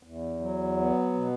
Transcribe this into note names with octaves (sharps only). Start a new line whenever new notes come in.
E2
F#3
B3
B2